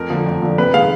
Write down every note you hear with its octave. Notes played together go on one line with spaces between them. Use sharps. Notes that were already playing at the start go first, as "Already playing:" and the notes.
Already playing: F2 A#4
D3 F3
F2
D3 F3
C3 B4
D#3 G#3 F5